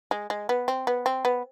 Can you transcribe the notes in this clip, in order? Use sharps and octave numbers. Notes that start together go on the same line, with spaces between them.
G#3
G#3
B3
C4
B3
C4
B3